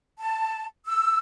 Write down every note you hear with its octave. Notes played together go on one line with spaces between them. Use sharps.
A5
E6